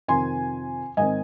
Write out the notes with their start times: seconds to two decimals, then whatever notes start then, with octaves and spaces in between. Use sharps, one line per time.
0.08 F2 C3 D#3 G#5 C6
0.97 G#2 D#3 C4 D#5 G#5